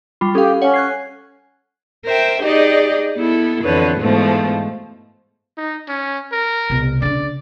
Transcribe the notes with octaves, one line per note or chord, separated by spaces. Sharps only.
G3 F4 B5
C#4 G4 A4 F5
C#4 C#5 F#5
F#6 G#6 C7
A#4 C5 E5 G5
D#4 G4 G#4 D5 D#5
B3 E4 A4
F2 D3 E3 B4 C#5
G#2 B2 E3 F3 A3
D#4
C#4
A#4
C2 B2
C#3 D4 D5